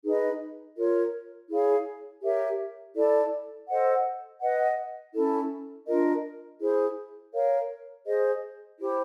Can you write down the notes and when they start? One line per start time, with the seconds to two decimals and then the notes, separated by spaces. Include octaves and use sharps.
0.04 D#4 G#4 B4 D#5
0.77 F4 A#4 C#5
1.49 E4 G#4 C#5 F5
2.22 G4 A#4 C#5 E5
2.95 E4 A4 D5
3.68 A4 C5 D#5 F#5
4.41 B4 D#5 F#5
5.14 C#4 E4 A4
5.87 D4 F4 A#4 D#5
6.60 E4 G#4 C5
7.33 A#4 C#5 F5
8.06 G#4 C5 D#5
8.79 E4 G4 C5